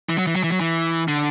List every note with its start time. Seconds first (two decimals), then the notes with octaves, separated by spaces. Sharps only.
0.09 E3
0.18 F#3
0.27 E3
0.36 F#3
0.44 E3
0.52 F#3
0.61 E3
1.08 D3